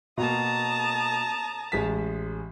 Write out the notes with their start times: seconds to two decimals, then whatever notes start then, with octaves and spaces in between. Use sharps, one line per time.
0.18 B2 A#3 A5 A#5 D#6
1.72 A1 G#3 B6